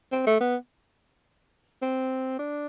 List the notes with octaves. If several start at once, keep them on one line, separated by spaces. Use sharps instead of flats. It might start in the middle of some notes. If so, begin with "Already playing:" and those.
C4
A3
B3
C4
D4